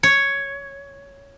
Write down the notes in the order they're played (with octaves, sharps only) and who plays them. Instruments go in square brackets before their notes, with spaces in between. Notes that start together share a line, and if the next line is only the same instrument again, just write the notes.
[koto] C#5